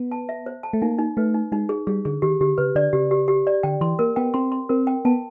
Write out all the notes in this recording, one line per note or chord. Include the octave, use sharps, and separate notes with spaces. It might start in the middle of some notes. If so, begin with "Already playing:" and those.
Already playing: B3
A5
E5
C5
A5
A3
A#3 D#4
D#4
A3 B4
D#4
G#3 D#4
G#4
G3 G#4
D3 G#4
D#3 G4
D3 G4
C#3 B4
D3 D5
C#3 G4
G4
G4
D5
D3 G5
E3 C6
A#3 A#4
B3 G5
C4 C6
C6
C4 A#4
G5
B3 A5